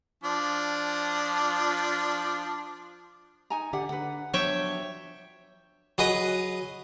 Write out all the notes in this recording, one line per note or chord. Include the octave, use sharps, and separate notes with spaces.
F3 D4
D#4 G#5 A#5
D3 G4 D5 F#5
D3 B4 F#5
F3 F#3 B3 D4 C#5 E5 G5
F#3 G#4 B4 D#5